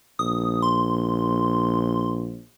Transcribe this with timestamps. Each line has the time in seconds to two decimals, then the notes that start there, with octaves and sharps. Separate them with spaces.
0.19 A#1 D#6
0.62 C6